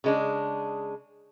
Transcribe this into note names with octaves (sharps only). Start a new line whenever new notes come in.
C#3 G#3 D4